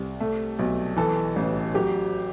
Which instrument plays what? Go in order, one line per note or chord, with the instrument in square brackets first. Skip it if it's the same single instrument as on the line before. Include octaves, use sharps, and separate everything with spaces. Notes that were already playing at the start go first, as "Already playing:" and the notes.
Already playing: [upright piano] C2
A3
B1
E3 A4
A1
F#3 G4